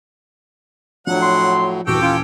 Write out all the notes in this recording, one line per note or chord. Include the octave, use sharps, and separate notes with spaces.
A2 F3 F#3 D4 F4 F#5
C6
D#1 G2 E3 F#4 G4 A4 G5
C#4 F4